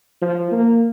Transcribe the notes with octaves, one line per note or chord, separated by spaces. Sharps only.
F3
A#3